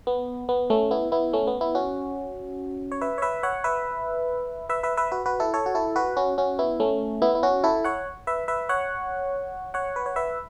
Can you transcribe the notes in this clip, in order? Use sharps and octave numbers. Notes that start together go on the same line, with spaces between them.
B3
B3
A3 C#4
B3 E4
B3 E4
A3 C#4
B3
B3 E4
C#4 F#4
C#5
B4 E5
C#5
B4 E5
C#5 F#5
B4 E5
B4 E5
B4 E5
B4 E5
F#4 B4
F#4 B4
E4 A4
A4 C#5
F#4
E4 A4
F#4 B4
C#4 F#4
C#4 F#4
B3 E4
A3 C#4
B3 E4
E4
C#4 F#4
E4 A4
C#5 F#5
B4 E5
B4 E5
C#5 F#5
C#5 F#5
B4
C#5
B4 E5